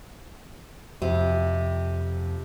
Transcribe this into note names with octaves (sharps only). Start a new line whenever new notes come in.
F2 C3